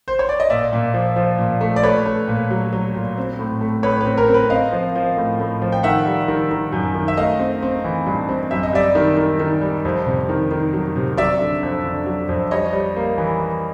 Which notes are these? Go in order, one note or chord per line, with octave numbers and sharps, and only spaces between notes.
C5
C#5
D5
D#5
A#2 D5 E5
A#2
F3
F3
A#2
A3
D5
A3 B4 C#5
A3
A#2
F#3
F#3
A#2
C4
A2
A3
A2 B4 C#5
C4 B4
A#4
C4
B4
C4 D#5 F5
F3
F3
A2
A2
F3
G5
D#3 E5 F#5
G3
D#3
D#3
F#2
D#3
E5
A3 D#5 F5
C4
C4
E3
G2
C4
F#2 E5
D#5
G3 D5 E5
D#3
D#3
D#3
G3
F2
C3
D#3
D#3
F#3
C3
F#3 D5 E5
D3
F2
D3
F#3
F2
G3 C#5 D#5
G3
A#3
E3
E3